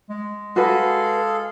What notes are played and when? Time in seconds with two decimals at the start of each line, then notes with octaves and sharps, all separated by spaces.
0.10 G#3
0.56 F#4 G#4 A4 B4 F5